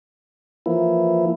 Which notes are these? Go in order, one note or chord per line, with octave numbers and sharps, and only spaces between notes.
E3 F3 A#3 E4